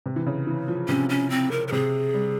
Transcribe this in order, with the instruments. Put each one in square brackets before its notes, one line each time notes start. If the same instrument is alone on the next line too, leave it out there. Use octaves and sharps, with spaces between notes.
[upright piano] C3
E3
C#3
E3
F3
[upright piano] C3 [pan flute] C#4
[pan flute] C#4
C4
A#4
A#4
[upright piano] C3 [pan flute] G#4
[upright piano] G3